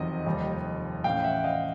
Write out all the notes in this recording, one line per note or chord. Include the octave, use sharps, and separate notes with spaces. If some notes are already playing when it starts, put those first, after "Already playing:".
Already playing: F1 E2 C3 D#3 F#3 D#5
F1 D#2 D#3 G3
A2 E3 A3 C#4 F5 G5
E5 F#5
D#5 F5